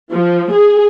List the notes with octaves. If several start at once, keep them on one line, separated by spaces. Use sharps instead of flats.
F3
G#4